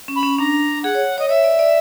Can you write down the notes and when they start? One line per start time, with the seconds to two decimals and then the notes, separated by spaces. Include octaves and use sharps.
0.08 C#4
0.16 B5
0.23 C#4
0.38 D4 A#5
0.83 G#4 F#5
0.95 C#5
1.18 C#5 D#5
1.29 C#5 E5
1.44 D5
1.59 D5